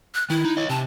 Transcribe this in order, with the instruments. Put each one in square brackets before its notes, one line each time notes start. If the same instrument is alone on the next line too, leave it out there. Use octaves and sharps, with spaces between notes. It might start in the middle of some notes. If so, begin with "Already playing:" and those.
[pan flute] F#6
[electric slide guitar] D#3 [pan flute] E4
[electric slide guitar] D#4
C#5 D#5
[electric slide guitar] C3 [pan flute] A5